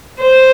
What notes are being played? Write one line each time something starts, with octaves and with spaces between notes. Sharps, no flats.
C5